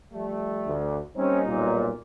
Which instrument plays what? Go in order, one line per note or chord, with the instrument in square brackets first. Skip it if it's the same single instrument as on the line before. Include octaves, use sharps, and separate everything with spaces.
[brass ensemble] F3 G3 A3
[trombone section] D2
[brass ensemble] G3 A#3 D#4 [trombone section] C4 C#4
[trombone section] B1 A#2